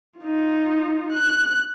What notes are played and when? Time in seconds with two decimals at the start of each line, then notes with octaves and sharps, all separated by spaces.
0.20 D#4 F4
1.12 F#6